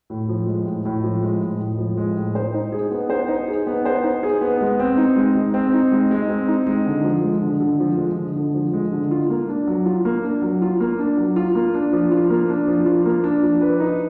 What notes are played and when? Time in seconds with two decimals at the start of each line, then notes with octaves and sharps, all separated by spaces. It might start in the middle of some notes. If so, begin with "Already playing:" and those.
0.10 A2
0.29 F3
0.47 G#3
0.66 A2
0.85 A2
1.04 F3
1.22 G#3
1.41 A2
1.60 A2
1.78 F3
1.97 G#3
2.16 A2
2.35 C5
2.54 D#4
2.72 G#4
2.91 B3
3.10 C5
3.28 D#4
3.48 G#4
3.67 B3
3.85 C5
4.04 D#4
4.23 G#4
4.41 B3
4.61 G#3
4.80 C4
4.97 D#4
5.16 G#3
5.35 G#3
5.54 C4
5.73 D#4
5.92 G#3
6.11 G#3
6.29 C4
6.48 D#4
6.67 G#3
6.86 D3
7.04 F3
7.24 G#3
7.42 D3
7.60 D3
7.80 F3
7.98 G#3
8.17 D3
8.36 D3
8.55 F3
8.73 G#3
8.92 D3
9.11 F4
9.30 A#3
9.49 D4
9.67 F#3
9.86 F4
10.05 A#3
10.24 D4
10.42 F#3
10.62 F4
10.80 A#3
10.99 D4
11.17 F#3
11.36 F4
11.55 A#3
11.74 D4
11.93 F3
12.11 F4
12.30 A#3
12.50 D4
12.67 F3
12.86 F4
13.06 A#3
13.24 D4
13.43 F3
13.61 B4
13.80 D#4